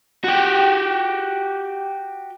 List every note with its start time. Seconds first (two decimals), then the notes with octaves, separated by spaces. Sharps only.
0.24 F#4 G4